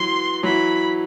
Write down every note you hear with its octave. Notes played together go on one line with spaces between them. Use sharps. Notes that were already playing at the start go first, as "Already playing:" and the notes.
Already playing: E3 F#3 C6
E3 F#3 B5